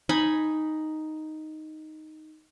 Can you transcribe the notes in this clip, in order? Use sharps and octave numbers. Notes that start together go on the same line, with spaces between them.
D#4 G#5 B5